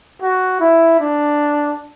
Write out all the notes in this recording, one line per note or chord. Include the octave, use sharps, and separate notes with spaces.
F#4
E4
D4